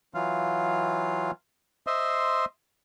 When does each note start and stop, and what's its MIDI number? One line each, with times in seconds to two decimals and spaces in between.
0.14 1.31 52
0.14 1.31 54
0.14 1.31 65
0.14 1.31 77
1.87 2.45 72
1.87 2.45 75
1.87 2.45 76
1.87 2.45 84